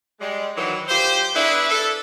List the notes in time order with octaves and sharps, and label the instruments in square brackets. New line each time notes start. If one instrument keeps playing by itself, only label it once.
[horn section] G3 G#3
D#3 E3 F#3
F4 G4 C5
B3 D4 E4 G#4 B4
A4